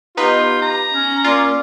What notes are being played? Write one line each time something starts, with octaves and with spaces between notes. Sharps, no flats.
B3 D#4 F4 G4 B4
A#5
C#4
A#3 F4 D5